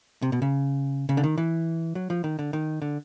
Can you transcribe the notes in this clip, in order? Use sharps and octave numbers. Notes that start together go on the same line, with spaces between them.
C3
B2
C#3
C#3
D3
D#3
E3
F#3
F3
D#3
D3
D#3
D3